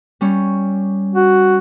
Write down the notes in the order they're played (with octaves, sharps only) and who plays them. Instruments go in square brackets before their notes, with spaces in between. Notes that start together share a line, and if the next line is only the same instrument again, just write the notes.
[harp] G3 C#4
[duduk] F#4